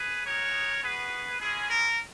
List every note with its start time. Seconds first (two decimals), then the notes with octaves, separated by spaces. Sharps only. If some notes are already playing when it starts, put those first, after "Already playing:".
Already playing: G#4 B4
0.25 G#3 D#4 F#4 A#4 C#5
0.82 B3 F#4 G#4 B4
1.41 G#3 C#4 E4 G#4
1.69 A#4